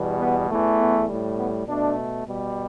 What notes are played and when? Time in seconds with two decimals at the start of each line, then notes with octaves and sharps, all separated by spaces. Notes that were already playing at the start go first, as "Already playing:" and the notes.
Already playing: E2 B2 G3
0.19 B3
0.49 E2 E3 A3
0.78 B3
1.08 A2 G3
1.38 B3
1.68 B2 A3 D4
2.26 B2 G3